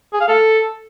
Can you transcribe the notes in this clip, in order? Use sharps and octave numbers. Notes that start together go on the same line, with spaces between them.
G#4
F5
A4